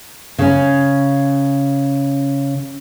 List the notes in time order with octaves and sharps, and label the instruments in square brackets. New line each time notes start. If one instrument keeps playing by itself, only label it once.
[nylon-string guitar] C#3 C#4